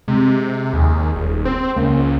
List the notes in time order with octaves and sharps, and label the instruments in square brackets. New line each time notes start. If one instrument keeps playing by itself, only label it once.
[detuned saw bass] C3 [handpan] G#3
[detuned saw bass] D#2 [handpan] G#4
[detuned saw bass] D#1
[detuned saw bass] C4 [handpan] C5
[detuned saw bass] C#2 [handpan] A#3 C#4